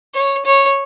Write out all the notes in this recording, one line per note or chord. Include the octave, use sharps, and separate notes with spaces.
C#5
C#5